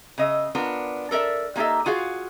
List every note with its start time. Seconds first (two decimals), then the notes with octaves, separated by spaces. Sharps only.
0.18 C#3 D#5 E5
0.55 B3 D4 F4 A#4
1.11 A4 A#4 D5 E5
1.56 G3 A#3 D#4 G4 A4 E5
1.86 F4 F#4 G#4 F5